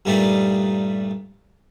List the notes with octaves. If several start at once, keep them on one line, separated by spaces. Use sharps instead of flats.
G2 A#2 G3 A3 D4 D#4